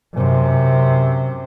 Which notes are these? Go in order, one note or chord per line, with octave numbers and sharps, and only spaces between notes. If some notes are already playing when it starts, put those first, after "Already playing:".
F#2 C3